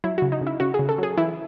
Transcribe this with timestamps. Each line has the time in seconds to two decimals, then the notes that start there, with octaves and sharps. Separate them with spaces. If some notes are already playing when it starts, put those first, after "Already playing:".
0.04 F#3 E4
0.18 C#3 F#4
0.32 D#4
0.41 C#3
0.47 E4
0.60 C#3 F#4
0.74 G#4
0.79 C#3
0.89 A4
0.98 F#3 G#4
1.17 E3 E4